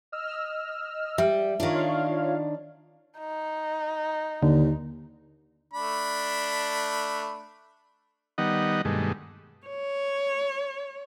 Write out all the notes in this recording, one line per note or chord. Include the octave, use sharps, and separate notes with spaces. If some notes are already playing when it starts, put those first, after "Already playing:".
D#5 E6 F6
G3 E5
D#3 D4 F4 C#5 F5
D#4
D#2 D3
A3 D4 B5
D#3 G3 B3 D#4 D#5 F#5
G2 B2 D#3 G#3 A3
C#5